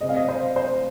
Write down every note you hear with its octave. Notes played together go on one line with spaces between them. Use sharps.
C3 G#3 C4 D#5
F5
D#5
C5
C5